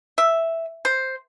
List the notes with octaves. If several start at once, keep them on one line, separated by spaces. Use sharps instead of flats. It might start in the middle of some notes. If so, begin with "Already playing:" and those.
E5
C5